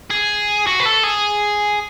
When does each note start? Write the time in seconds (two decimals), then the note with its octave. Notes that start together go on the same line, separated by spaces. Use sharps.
0.11 G#4
0.67 F#4
0.80 B4
0.86 A4
1.03 G#4